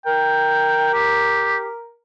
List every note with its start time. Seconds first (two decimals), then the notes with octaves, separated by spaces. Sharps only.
0.06 A#4 G5
0.94 G4